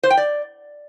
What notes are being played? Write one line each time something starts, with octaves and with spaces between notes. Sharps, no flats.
C5
G5
D5